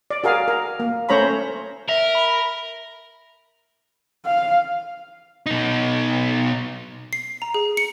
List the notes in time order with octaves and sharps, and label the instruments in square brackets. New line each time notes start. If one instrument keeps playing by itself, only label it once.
[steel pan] D5
F#4 G#4 A#4 F5
A#4
A#3
A3 C#4 C5 C#5 A#5 B5
[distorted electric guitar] A#4 [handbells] E5
[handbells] B5
[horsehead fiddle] F5
[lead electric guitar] B2 D#4
[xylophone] C7
A#5
G#4
C#7